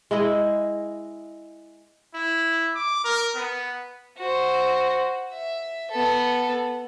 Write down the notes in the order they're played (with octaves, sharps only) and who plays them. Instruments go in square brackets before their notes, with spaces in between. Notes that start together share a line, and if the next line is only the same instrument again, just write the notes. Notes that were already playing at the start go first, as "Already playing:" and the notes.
[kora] G#3 E4 D#5
[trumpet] E4
D6
A#4
B3
[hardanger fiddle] F#4 C5
E5
B3 A4